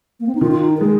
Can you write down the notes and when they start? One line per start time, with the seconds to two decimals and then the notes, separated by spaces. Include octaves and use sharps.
0.20 A#3
0.27 C4
0.35 D#4
0.41 D#3 F4
0.51 F4
0.61 D#4
0.77 A#4
0.81 G#3 G#4